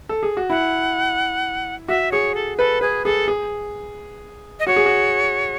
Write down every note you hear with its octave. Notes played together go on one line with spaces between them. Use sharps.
A4
G#4
F#4
E4 F#5
F#4 E5
G#4 C#5
A4
A4 B4
G#4 B4
G#4 A4
G#4
D#5
F#4 C#5
G#4
F#4